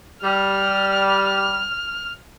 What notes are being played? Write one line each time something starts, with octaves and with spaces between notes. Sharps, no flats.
G3 F6